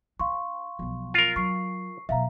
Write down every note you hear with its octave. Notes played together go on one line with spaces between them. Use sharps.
D4 F5 C6 C#6
B1 F3
F4 A#4
F#3 C#6 C7
B2 F#3 E5 F5 A#5